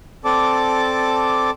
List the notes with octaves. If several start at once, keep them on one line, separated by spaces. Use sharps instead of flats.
C4 A4 D5 A5 D6